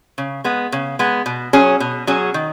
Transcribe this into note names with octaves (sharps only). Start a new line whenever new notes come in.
C#3
G#3 B3
C#3
G#3 B3
B2
F#3 C#4 G#4
B2
F#3 C#4 G#4
D#3